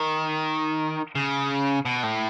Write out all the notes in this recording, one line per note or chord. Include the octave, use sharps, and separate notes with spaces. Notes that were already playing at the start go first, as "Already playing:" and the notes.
Already playing: D#3
C#3
B2
A2